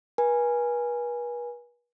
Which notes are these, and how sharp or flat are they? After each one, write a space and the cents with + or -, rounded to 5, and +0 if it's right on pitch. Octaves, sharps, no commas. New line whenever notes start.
B4 -40 G#5 -5